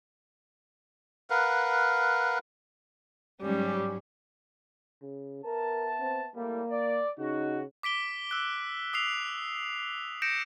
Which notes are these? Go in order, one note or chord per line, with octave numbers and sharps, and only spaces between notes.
A#4 B4 F5 F#5
G#2 F#3 G3 C#4
C#3
B3 A#4 E5 A5
C4
A2 G3 A#3
D5
C#3 D#4 F#4
D6 B6 D7 G7
E6 F#6
D#6 E6 C7 F7
G6 A#6 C#7 D7 E7